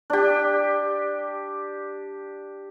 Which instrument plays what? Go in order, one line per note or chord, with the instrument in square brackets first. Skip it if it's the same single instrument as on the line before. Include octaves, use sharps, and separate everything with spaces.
[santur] D4 G4